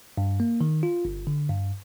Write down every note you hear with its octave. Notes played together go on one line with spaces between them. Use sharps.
G2
A#3
D#3
F4
G1
D3
G2